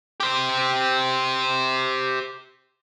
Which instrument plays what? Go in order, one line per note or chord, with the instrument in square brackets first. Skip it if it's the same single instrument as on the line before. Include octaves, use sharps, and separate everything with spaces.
[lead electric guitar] G4 C5